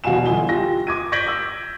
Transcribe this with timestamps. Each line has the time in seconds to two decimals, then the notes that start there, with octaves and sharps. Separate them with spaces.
0.04 E2 B2 F5 F#5 G#5 E7
0.26 G1 F4 G#5 G7
0.49 F4 G4 A#6
0.87 D6 G#6 D#7
1.12 G6 G#6 A#6 B6 D7 F#7
1.27 D6 E6